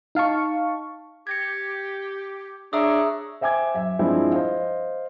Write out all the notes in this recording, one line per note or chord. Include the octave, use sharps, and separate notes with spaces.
D#4 F5 A5 C#6
G4 G#6 A#6 C#7
D4 G#4 C#5 E5 A#5 C#6 D#6 E6
C5 E5 G5 G#5 D6 G#6
F#2 E5
G2 F3 G#3 C4 D4 E4
C5 D#5 F5